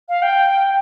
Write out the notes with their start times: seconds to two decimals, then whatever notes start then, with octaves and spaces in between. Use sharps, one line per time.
0.09 F5
0.22 G5